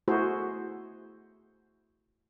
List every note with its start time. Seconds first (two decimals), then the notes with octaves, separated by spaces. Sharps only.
0.08 A3 E4 F#4 G#4 C5